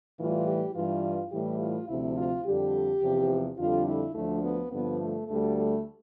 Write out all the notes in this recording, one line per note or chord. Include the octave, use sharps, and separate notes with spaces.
A2 E3 G3 F4
G4
G2 E3 G3 F4
A2 E3 G3 G4
F4
D2 C3 F3 E4
F4
F2 D3 G3 G4
E2 C3 F3
F2 D3 G3 F4
E4
D2 D3 F3 A3
B3
G2 D3 F3 B3
A3
D2 D3 G3 A3
A3